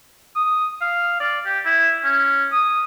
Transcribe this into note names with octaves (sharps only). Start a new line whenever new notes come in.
D#6
F5
D5
G4
E4
C#4
D#6